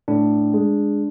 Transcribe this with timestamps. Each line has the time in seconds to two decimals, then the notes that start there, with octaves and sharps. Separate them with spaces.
0.08 A2 D4
0.53 G#3